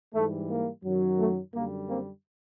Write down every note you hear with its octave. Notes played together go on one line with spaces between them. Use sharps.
G#2 E3 G3 A3
A#3
F#2 D#3 F#3
A3
F#2 D3 G3 A#3
A#3 C4